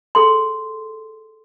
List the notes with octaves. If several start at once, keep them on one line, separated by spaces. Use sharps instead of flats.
G#4 A4 C6